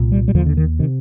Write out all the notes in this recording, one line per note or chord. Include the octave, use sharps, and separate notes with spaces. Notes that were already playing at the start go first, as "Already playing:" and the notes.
Already playing: C2 A#2
G3
G3
D#2 D3 F3
D3
D#3
C3 D#3